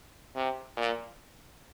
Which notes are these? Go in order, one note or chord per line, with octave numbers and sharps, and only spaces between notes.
C3
A#2